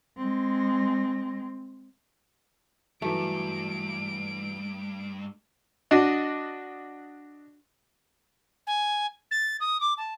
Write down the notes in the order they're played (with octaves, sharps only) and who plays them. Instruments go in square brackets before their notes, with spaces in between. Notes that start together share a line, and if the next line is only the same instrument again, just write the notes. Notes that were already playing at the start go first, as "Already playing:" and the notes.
[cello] G#3 C4
[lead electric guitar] G2 [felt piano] E3 F#3 [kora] A3 [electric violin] D7
[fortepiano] D4 F#4 D#5
[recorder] G#5
A6
D#6
D6
A5